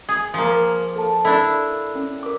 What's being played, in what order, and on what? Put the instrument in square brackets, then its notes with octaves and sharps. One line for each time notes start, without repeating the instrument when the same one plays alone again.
[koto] G#4
F3 A#3
[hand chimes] A4 A5
[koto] D4 E4 [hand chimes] A4
[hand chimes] C#4
A#4 D6